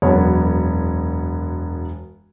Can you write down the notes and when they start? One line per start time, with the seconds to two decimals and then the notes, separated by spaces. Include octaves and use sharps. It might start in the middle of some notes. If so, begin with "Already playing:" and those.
0.02 E1 F#2 B3 C#5